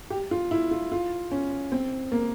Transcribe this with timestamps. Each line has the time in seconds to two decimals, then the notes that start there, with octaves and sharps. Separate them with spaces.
0.10 G4
0.31 F4
0.51 E4
0.71 F4
0.92 F4
1.31 C#4
1.72 C4
2.12 A#3